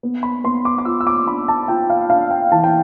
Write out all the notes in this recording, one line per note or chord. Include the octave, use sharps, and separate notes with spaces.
B3
B5
B3 C6
D6
D6
F4 E6
E6
D6
D4 B5
A5
F4 G5
F5
D4 F5
G5
E3 A5
G5